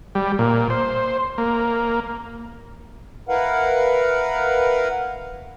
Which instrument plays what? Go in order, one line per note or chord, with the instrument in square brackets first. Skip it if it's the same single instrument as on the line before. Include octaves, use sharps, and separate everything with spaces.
[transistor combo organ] G3
A#2
C5
A#3
[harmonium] E4 A#4 B4 F5 F#5